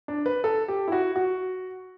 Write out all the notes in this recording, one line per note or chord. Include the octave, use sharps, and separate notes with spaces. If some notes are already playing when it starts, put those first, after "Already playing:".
D4
B4
A4
G4
E4
F#4
F#4